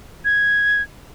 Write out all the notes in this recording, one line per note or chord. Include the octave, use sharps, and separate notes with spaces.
G#6